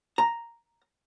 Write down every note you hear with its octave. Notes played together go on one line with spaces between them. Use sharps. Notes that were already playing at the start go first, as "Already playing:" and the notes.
A#5